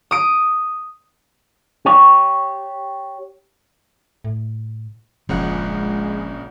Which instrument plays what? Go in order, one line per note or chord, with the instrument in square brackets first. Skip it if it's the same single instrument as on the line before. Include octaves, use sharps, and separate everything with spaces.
[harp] D#6 D7
[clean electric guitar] G4 C#5
[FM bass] A2
[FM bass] F1 [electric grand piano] A#1 C#3 F#5 [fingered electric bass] F3 [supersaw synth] G#3